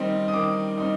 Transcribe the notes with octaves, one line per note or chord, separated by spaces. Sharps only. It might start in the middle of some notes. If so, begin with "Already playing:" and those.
Already playing: D#3 G3 C4 D#4
D#6
D#3 D6
G3 C4 D#4